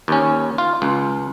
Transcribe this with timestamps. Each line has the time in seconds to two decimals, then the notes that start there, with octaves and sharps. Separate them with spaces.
0.08 D#2 C#4
0.58 F4
0.82 C#2